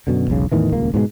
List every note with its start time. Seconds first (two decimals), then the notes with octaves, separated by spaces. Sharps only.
0.07 F#2 B2 D3
0.28 E1 B1 C#3
0.52 E2 A2 D#3 E3
0.72 D#1 C#2 A#3
0.94 G#2 B2 F#3 G#3